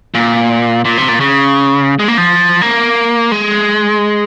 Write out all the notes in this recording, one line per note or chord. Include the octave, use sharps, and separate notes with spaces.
A#2
A#2
C3
A#2
C#3
G#3
A#3
F3
A#3
G#3